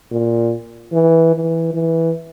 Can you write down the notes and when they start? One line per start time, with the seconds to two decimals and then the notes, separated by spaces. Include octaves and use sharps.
0.11 A#2
0.93 E3
1.35 E3
1.74 E3